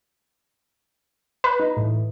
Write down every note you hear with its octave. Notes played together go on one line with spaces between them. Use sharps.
B4
D#4
A2 E3